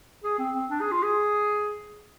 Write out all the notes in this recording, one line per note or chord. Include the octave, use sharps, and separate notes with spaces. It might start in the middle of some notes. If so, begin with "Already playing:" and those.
G#4
C4
C4
D4
G#4
F4
G#4